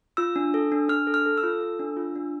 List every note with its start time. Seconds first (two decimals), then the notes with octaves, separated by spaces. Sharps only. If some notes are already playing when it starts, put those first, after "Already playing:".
0.17 F4 E6
0.36 D4
0.54 A4
0.72 D4
0.89 D4 F6
1.07 A4
1.14 F6
1.26 A4
1.38 E6
1.43 F4
1.61 A4
1.79 D4
1.97 F4
2.15 D4